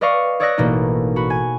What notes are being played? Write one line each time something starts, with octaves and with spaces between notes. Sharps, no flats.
B4 D5 D#5 F5 C#6
C#5 D5 D#6 E6 F#6 A#6
A1 B2 A#3 D#4
F#4 B5
G#5